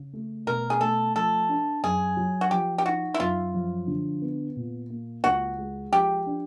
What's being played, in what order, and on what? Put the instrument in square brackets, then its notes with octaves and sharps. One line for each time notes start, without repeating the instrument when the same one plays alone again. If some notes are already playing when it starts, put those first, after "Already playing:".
Already playing: [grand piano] C#3
A3
[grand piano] B2 [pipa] A#4
[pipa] G#4
[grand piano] A3 [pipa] A4
[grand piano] F3 [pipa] A4
[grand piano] D4
[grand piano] F#2 [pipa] G#4
[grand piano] F#3
[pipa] F#4
[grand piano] F3 [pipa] G4
[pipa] G4
[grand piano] D#4 [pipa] F#4
[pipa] E4
[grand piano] F#2 [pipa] F4
[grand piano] F3
D3
B3
A#2
A#3
[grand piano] C#2 [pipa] F#4
[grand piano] G#3
[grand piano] F3 [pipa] G4
[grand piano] D4